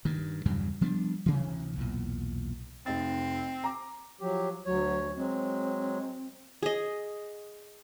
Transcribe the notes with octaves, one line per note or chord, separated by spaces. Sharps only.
G2 D#3
E2 G2 C#3 F#3
F3 G3 B3 D4
D2 C3 E3
B1 E2 A#2
F1 C4 D#4 A6
A#5 D6
F3 F#3 G4
D2 F#3 C#5
F#3 G#3 C4
G#4 D#5